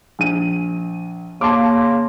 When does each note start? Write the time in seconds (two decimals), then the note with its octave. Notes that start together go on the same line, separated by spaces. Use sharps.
0.19 A#1 D#7
1.41 C#3 A#3 A5 C6 D6